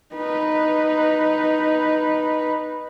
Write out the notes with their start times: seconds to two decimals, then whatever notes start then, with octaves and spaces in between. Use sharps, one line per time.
0.15 D#4 B4